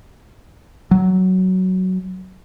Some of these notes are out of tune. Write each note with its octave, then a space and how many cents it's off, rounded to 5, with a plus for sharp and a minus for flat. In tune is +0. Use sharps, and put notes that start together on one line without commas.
F#3 +10